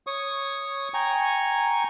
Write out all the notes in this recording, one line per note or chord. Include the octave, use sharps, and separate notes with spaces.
C#5 C#6 D#6
G5 G#5 A#5 C#6